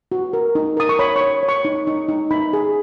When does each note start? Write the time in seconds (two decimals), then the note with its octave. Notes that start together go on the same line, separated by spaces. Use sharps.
0.12 F#4
0.33 A#4
0.55 D#4
0.77 A#4 D#6
0.89 C#6
0.99 C#5 B5
1.16 C#6
1.21 C#5
1.43 C#5
1.49 C#6
1.65 D#4
1.87 D#4
2.09 D#4
2.31 D#4 B5
2.53 G#4